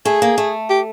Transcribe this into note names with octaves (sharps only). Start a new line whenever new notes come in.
A3 G#4
A#3
A3
G4